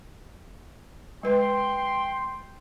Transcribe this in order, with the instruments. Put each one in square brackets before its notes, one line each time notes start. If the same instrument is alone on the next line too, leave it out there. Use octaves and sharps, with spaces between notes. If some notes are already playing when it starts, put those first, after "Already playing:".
[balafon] G#3 B4 [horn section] G5 C6